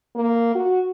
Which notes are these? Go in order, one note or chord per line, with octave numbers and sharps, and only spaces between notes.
A#3
F#4